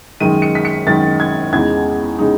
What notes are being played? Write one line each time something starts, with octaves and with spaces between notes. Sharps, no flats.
F#2 D#3 G#3 D#7
C#7
B6
C#7
F#2 D#3 G#3 A6
G#6
E2 C#3 G#3 D#4 G#6
C#3 G#3 D#4